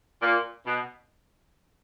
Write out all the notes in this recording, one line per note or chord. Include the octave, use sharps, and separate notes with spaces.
A#2
B2